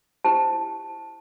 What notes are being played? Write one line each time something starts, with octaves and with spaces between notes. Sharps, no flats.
E4 G4 C5 A5